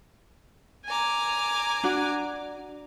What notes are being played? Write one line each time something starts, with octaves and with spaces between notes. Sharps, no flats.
G#5 A#5 D6
D4 F#4